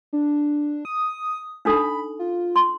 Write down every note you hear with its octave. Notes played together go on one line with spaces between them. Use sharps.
D4
D#6
D4 D#4 A4 B5
F4
C6